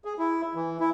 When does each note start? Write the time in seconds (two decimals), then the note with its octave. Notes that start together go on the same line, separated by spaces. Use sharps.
0.05 G#4
0.18 E4
0.55 E3
0.80 E4